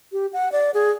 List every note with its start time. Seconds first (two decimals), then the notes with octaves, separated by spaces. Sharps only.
0.12 G4
0.33 F#5
0.52 D5
0.74 G#4